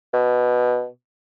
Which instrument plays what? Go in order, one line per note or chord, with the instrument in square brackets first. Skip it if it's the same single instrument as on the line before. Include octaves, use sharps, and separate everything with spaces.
[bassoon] B2